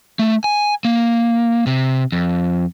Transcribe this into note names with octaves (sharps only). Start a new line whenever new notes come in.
A3
G#5
A#3
C3
F2